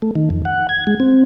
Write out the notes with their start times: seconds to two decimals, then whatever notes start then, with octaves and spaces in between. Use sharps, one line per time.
0.02 A3
0.15 D#3
0.30 F2
0.45 F#5
0.69 G#6
0.87 G#3
1.00 C4